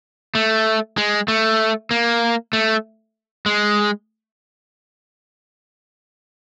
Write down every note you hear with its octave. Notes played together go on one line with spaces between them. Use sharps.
A3
G#3
A3
A#3
A3
G#3